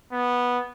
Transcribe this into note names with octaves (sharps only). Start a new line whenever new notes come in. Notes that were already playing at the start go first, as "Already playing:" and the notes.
B3